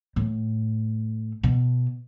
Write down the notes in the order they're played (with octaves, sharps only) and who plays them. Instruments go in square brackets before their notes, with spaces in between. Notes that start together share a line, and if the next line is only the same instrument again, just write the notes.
[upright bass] A2
B2